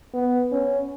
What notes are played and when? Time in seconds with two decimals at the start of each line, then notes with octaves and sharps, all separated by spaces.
0.14 B3
0.51 C#4